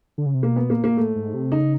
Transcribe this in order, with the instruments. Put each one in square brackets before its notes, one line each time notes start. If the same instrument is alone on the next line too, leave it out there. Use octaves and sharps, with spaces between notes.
[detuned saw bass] D3
C#3
C3
[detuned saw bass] B2 [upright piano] A#3
[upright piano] B3
[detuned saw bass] A#2 [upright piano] A#3
[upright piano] A#3
[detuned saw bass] A2 [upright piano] A3
[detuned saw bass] G#2
C3
[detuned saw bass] C#3 [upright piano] D#4